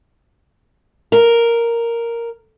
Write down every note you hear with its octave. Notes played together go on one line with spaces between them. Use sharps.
A#4